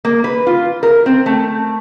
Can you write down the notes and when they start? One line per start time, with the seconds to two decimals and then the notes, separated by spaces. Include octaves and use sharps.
0.05 A#3
0.24 B4
0.47 F4
0.83 A#4
1.06 C4
1.26 A3